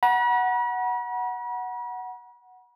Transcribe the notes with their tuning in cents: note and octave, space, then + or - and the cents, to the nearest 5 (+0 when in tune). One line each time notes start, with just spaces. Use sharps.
F#5 +0 B5 -45